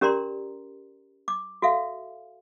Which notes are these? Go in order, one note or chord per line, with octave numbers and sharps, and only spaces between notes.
C#4 G4 A#4 D5 A#5 C6
D6
F#4 A4 E5 F5